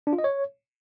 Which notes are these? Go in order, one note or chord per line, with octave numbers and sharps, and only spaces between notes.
D4
F4
D#5
C#5